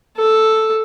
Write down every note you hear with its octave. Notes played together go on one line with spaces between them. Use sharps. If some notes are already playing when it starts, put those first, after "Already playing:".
A4